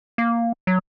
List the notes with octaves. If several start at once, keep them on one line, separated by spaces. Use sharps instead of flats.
A#3
F#3